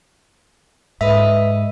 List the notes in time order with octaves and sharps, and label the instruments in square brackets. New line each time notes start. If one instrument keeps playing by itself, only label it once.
[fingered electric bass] G#2 [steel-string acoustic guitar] B4 D#5 [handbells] E5